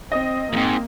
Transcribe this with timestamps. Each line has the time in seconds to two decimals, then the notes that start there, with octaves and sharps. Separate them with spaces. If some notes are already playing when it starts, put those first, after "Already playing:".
0.12 C4 D#5
0.53 F2 G#2 A#3 C4